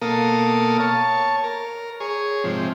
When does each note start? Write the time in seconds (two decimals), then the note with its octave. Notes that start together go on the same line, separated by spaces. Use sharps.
0.02 B2 A#3 A4 A#4 F5 D#6
0.80 C#5 A5
1.44 A#4
2.00 G#4 C#5
2.44 G#2 C3 F3